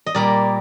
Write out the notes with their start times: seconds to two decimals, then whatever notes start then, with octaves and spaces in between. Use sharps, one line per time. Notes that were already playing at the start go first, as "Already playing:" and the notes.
0.06 D#5
0.15 A#2 G3 A#4 D5